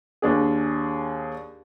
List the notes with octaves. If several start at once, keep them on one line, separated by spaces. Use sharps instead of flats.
D#2 D4 G#4